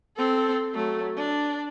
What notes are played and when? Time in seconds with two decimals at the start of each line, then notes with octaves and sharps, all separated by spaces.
0.17 C4 A4
0.74 F#3 A3
1.17 D4